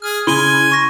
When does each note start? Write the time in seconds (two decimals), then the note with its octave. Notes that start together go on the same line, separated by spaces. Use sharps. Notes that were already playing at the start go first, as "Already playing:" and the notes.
0.02 G#4 F6
0.27 C#3 E4 G#5 C6 G7
0.72 C#6 A#6